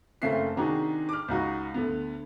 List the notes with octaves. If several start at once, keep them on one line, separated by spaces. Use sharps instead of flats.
F#1 C#3 A3 C4 E5 C7
C3 D#3 D4 D#4 F#4 G#4
D6 F6
C#2 D#4 F#4
D2 D3 B3